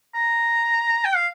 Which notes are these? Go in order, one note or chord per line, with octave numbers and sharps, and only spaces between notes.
A#5
G5
F5